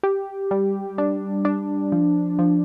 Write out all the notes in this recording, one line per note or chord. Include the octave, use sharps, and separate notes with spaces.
G4
G3
D4
D4
F3
F3